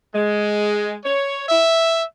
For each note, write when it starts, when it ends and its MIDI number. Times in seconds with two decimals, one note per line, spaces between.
0.14 0.95 56
1.05 1.45 73
1.49 2.03 76